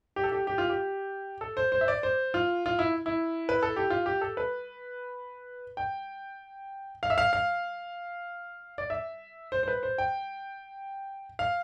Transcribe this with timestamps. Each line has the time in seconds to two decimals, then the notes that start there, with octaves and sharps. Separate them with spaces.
0.16 G4
0.23 A4
0.32 G4
0.47 G4
0.58 F4
0.70 G4
1.41 A4
1.57 C5
1.72 C5
1.81 E5
1.88 D5
2.03 C5
2.34 F4
2.66 F4
2.79 E4
3.06 E4
3.49 B4
3.63 A4
3.76 G4
3.90 F4
4.06 G4
4.21 A4
4.37 B4
5.77 G5
7.03 F5
7.10 E5
7.18 F5
7.33 F5
8.78 D5
8.90 E5
9.52 C5
9.63 C5
9.68 B4
9.83 C5
9.98 G5
11.39 F5